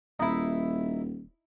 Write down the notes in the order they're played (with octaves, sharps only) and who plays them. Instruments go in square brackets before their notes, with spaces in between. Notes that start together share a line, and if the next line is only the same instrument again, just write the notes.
[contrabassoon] D#1 [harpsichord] D#4 E4